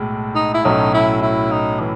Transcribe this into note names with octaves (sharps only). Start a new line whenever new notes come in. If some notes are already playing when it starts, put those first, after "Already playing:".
Already playing: B1 A2 G#3
D#4
E4
B1 A2 F#3 A3 C#4 D#4
E4
E4
D#4
E3